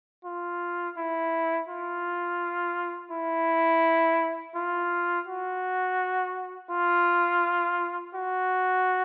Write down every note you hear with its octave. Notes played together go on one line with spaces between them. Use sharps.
F4
E4
F4
E4
F4
F#4
F4
F#4